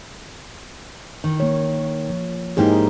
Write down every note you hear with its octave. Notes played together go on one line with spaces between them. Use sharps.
D#3
A#3 C#5
F3
G#2 A#3 D#4 E4 G4 G#4